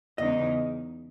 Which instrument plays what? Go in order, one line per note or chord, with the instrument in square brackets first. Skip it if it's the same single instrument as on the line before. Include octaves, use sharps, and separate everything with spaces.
[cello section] E2 C#3 G#3 D#4 [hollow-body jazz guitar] D#5